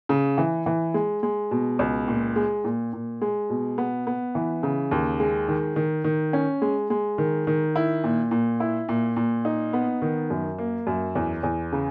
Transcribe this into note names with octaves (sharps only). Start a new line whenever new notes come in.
C#3
E3
E3
G#3
G#3
B2
C#2
A#2
G#3
A#2
A#2
G#3
B2
B3
B3
E3
C#3
D#2
G#3
D#3
D#3
D#3
C#4
G#3
G#3
D#3
D#3
E4
A#2
A#2
E4
A#2
A#2
D#4
B3
D#3
F#2
A#3
F#2
E2
E2
C#3